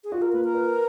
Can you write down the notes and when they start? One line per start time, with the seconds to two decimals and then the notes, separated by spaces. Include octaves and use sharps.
0.04 G#4
0.12 F4 F#4
0.22 A#4
0.33 A#3 B4
0.44 A#4
0.54 B4